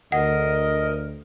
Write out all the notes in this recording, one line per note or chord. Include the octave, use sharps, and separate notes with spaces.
D2 A#4 D#5 F#5